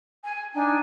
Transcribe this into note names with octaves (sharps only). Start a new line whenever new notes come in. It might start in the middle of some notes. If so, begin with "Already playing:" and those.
G#5
D4 D#4 G5 G#5